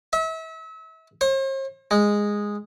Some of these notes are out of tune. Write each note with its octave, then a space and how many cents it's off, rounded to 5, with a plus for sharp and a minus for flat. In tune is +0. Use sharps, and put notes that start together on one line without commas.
E5 -35
C5 +45
G#3 -10